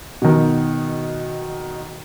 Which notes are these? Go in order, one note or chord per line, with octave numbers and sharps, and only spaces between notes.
B2 D#3